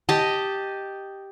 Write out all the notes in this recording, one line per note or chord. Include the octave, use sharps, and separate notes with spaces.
G4 D#5 A5